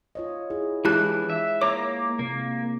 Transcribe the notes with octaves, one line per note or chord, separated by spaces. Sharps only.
F4 C#5 D#5
E4 G#4
E3 G#3 D4 E4 G4 G#4 A5 F#6
E5
A#3 C#5 A#5 D6
C3 A#3